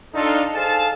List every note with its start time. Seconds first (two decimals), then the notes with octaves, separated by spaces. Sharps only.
0.15 D4 D#4 F4 A4
0.55 G#4 A4 C5 F5 A5